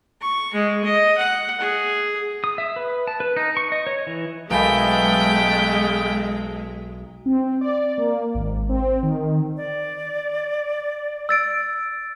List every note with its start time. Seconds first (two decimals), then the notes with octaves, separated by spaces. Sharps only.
0.21 C#6
0.53 G#3
0.84 D#5
1.17 F#5
1.60 G#4
2.44 D#6
2.58 E5
2.76 B4
3.07 A5
3.20 B4
3.36 D#4
3.57 C#6
3.72 D#5
3.87 C#5
4.07 E3
4.51 B1 G#3 A3 F5 G5 G#5 B5
7.26 C4
7.61 D5
7.98 A#3
8.34 G#1
8.69 C4
9.03 D#3
9.57 D5
11.29 E6 A6 D7